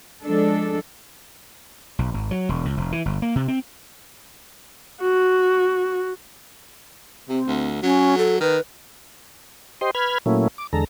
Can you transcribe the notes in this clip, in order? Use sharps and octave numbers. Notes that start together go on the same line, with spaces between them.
F3 G#3 D4 A4
B1
G#1
F#3
E1
C#2
F1
E3
G1
A#3
C3
C4
F#4
C3 C4
D2
F#3 C#4
A4
D#3 B4
G4 C5 D#5 C6
B4 B5 F6 G#6
A#2 F#3 A3 A#3 C#4 E4
D6
E2 D3 G#3 A4 A#5